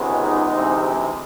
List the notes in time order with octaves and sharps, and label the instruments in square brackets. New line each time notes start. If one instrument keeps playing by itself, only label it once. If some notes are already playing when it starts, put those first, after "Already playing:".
Already playing: [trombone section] C#2 C3 D#3 G#3 B3
D#4
D2 C3 E3 G#3 C4